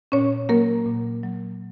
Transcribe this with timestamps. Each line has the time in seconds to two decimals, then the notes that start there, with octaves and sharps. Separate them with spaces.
0.12 A#2 C#4 C#5
0.49 F#3 A#3 A#4
0.86 A#2
1.23 F#3